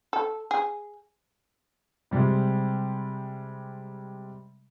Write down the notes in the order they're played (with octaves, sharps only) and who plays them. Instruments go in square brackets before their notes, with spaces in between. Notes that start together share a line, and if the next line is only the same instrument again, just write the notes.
[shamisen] A4
G#4
[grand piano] C3 G3 G#3